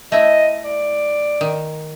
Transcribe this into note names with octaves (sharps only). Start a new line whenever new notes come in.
A3 E4 D#5
D5
D#3